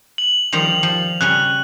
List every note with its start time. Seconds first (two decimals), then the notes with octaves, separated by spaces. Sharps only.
0.18 F#7
0.53 D#3 F3 G3 F7
0.83 F3
1.21 C#3 G3 C#4 F#6